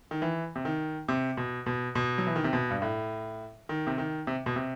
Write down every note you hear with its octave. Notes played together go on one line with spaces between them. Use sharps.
D#3
E3
C3
D#3
C3
B2
B2
B2
F#3
E3
D#3
C3
B2
G2
A2
D#3
C3
D#3
C3
B2
C3